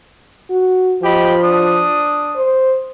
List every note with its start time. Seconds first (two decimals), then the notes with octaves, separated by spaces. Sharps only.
0.50 F#4
1.03 F3 G4 D#5 B5
1.42 D4 D#6
2.36 C5